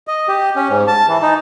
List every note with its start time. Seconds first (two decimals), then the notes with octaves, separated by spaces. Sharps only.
0.07 D#5
0.28 G4
0.56 C#4
0.69 G#2
0.87 A5
1.08 E3
1.22 D#4